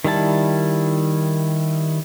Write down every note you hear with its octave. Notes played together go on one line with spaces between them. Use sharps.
D#3 G3 E4 A5